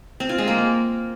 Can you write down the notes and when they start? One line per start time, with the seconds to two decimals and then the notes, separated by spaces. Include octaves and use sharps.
0.20 C4
0.29 F4
0.38 G#3
0.48 A#3